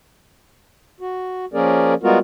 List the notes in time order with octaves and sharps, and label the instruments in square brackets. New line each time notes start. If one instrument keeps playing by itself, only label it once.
[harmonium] F#4
F3 A#3 C#4 G#4 A#4 D5
G3 G#3 B3 F4 F#4 A#4